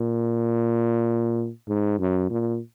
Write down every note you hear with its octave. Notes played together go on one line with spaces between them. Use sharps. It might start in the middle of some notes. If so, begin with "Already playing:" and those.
Already playing: A#2
G#2
F#2
A#2